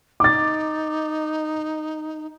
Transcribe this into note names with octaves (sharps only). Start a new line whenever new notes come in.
D#4 D6 A6